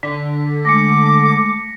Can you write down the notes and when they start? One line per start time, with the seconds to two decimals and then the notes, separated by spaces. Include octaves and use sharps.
0.03 D3 B6
0.65 G#3 A3 D6 A#6 C#7